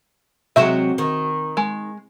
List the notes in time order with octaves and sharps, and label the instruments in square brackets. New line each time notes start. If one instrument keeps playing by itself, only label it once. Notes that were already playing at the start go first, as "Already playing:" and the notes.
[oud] C3 F#3 G#3 [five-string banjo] F#4 C5 E5
[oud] D#3
[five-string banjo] G#3